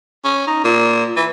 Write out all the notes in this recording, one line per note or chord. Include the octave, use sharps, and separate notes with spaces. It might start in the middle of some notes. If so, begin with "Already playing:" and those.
C#4
D#4
A#2
E3